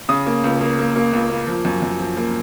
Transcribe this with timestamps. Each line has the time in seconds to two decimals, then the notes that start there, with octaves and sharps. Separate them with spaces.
0.09 C#3 D#6
0.26 A#3
0.44 C#2
0.61 A#3
0.79 A#3
0.96 A#3
1.13 C#2
1.30 A#3
1.47 F3
1.65 F#2
1.82 F#2
2.00 F3
2.17 A#3